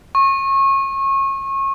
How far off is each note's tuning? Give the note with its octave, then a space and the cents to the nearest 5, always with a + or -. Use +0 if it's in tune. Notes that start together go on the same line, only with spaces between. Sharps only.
C#6 -30